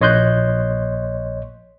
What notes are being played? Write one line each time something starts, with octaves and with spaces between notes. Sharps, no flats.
A#1 C#5 D#5 C6 F#6 G6